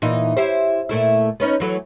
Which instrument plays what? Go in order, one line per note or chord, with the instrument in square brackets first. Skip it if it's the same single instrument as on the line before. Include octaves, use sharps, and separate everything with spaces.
[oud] A#2 E3 D#4
E4 G4 C5
A#2 A3 E4
B3 C#4 D#4
E3 F#3 A3